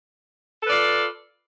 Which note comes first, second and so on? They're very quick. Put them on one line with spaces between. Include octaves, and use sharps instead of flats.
A4 B4 D5 F4